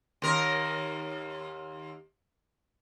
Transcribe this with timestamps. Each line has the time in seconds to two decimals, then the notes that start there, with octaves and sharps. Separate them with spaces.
0.22 D#2 A#4